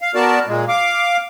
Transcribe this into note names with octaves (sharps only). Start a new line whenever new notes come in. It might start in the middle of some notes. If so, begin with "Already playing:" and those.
F5
B3 F#4 A#4 D5 A5
A#2 G#3
F5 D6